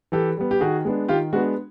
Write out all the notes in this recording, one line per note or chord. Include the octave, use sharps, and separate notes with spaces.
E3 G4 A4
G3 B3
G4
D#3 F#4 G#4
G#3 B3 D4
D#3 F4 G4
G#3 B3 D4 F#4